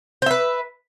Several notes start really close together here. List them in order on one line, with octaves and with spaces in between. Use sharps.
C5 E5 B4